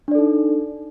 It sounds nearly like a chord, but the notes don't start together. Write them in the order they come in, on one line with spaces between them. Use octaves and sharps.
D4 D5 A4 D#4